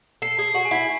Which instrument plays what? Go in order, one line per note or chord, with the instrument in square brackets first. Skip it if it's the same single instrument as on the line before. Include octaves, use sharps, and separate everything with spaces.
[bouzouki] A4 [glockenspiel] C7
[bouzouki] G#4
[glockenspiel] C7
[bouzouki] F#4
[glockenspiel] G#5
[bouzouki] E4